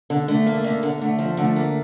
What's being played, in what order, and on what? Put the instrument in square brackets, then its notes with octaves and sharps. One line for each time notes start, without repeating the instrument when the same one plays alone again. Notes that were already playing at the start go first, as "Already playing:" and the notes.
[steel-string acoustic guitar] D3
[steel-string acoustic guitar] D3 [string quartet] A3
[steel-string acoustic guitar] A#3
D3
D3
[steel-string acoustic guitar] D3 [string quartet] A3
[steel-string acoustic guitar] F3
[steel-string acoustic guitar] D3 [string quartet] A3
[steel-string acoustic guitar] A#3